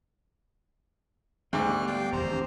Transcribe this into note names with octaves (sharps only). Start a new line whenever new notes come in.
D2 G#2 G#3 D6 F6 F#6
G3 B3 G4
D5 F5 G5
E1 D#2 C5 A#5
C4 D4 G4